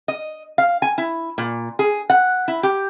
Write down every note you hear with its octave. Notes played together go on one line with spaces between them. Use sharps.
D#5
F5
G#5
E4
A#2
G#4
F#5
E4
G4